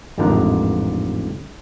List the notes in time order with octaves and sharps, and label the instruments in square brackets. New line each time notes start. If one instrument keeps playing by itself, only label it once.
[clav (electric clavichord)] A1 F2 G#2 D3 A#4